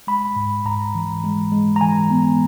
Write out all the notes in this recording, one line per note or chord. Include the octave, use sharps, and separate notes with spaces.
G#3 B5
G#2
G#2 A#5
E3
G#3
G#3
A#5
E3 G#5
B3